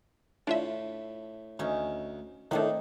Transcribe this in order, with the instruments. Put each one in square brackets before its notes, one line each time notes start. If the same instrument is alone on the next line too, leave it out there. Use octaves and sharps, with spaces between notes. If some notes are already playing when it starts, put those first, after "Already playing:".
[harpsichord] A2 [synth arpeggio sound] D4 F4 E5
[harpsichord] D2 [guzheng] C#4 D#4
[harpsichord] A2 [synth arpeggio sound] D#3 A3 [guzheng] C4 D4 D#4